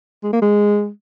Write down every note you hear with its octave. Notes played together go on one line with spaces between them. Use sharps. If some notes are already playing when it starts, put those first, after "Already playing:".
G#3
A#3
G#3